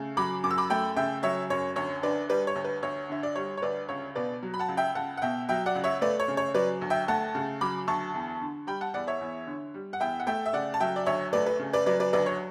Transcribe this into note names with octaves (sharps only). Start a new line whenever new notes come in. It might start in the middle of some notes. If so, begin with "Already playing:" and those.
Already playing: C#3 A3
F#3 B5 D6
F#2 D6
E6
B5 D6
A3 G5 B5
C#3 E5 G5
F#3 C#5 E5
F#2 C#5
D2 C#5
D3 B4 D5
G3 B4 D5
C#5
D2
B4
D2 C#5
D3 E5
D5
G3 C#5
C#5
D2 B4 D5
C#2 C#5
B2 B4 D5
F#3
B5
F#5 A5
C#2
E5 G5
C#2 F#5 A5
F#5
B2 E5 G5
F#3 E5 G5
D5 F#5
C#2
C#5 E5
A3 B4 D5
C#5
C#3
C#5
F#3 B4 D5
D2
E5 G5
A3 F#5 A5
C#3
F#3 B5 D6
D2 A5 C#6
E2
D3
G3 G5 B5
F#5 A5
E2 D5 F#5
C#5 E5
E2
D3
G3
F#5
E2 E5 G5
F#5
A3 E5 G5
E5
C#3 D5 F#5
A5
F#3 E5 G5
D5
D2 C#5 E5
A3 B4 D5
B4
C#3
B4 D5
F#3 B4 D5
B4 D5
D2 B4 D5
C#5